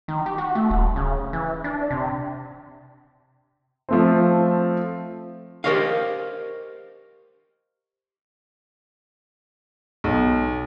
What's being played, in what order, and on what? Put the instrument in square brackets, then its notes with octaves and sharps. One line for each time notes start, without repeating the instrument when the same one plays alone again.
[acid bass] D#3
G4
F#4
A3
D#1
C#3
E3
D4
C3
[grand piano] F3 A3 C4
[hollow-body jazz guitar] G4 A#4 C5 C#5 D#5 F5
[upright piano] B1